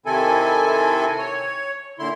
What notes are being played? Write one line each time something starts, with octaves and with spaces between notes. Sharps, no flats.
C3 D#3 C4 E4 A4 G#5
C#5
A#2 D3 E4 C6